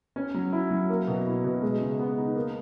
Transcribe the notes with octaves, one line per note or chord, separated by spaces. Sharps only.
C#4
F#3
E4
F#3
A#3
B2
E4
B2
G#3
C#3
B3
D#4
A#3